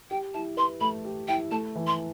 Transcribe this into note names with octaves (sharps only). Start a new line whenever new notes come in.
G4 G5
E4 A5
B4 C6
A3 B5
G4
E4 G5
A3 A5
E3
C6